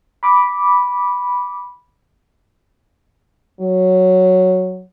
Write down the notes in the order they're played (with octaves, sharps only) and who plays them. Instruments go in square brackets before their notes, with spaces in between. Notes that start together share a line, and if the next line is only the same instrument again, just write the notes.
[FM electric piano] B5 D6
[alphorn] F#3